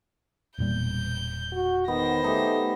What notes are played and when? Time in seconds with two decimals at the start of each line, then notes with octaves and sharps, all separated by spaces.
0.58 E1 A#2 G3 G6
1.53 F#4
1.88 D#3 B3 C5 A#6
2.24 A3 D#4 G4